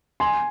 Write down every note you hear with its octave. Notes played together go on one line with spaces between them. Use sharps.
G#5 C6